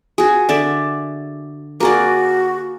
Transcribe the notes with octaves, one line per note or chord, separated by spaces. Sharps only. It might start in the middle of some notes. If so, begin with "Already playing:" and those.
F#4 G#4
D3 D5 E5
A#3 F#4 G#4 D5